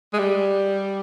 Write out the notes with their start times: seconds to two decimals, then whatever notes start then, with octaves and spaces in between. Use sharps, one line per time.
0.13 G#3
0.19 G3